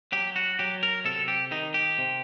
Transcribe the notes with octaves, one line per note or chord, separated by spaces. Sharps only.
F#3 G4
F#4
F#3 G4
A#4
C3 A4
G4
D#3 D#4
G4
C3